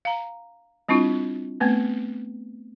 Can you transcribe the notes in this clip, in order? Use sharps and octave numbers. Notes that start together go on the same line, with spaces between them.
F5 A#5
G3 C4 D4 E4 F4
A3 B3 C4 B4